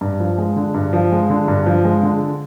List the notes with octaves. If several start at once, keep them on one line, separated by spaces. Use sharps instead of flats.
G2
F3
G#3
D3
G2
F3
G#3
D3
G2
F3
G#3
D3